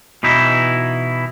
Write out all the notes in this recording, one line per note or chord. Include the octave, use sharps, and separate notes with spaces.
B2 E3 D#4 E4